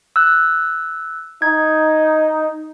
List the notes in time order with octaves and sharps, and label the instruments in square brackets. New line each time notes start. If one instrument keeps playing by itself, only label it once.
[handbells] E6 F#6
[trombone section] D#4 [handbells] G#6